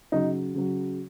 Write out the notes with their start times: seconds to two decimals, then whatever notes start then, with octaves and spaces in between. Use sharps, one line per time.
0.12 C#3 F#3 D#4
0.54 C#3 F#3